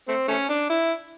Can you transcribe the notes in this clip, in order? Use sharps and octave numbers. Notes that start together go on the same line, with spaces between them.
A3 C4
A3 C#4
D4
E4